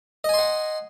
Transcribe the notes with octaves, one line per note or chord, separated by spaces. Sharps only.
D#5 F#5 G#5 C6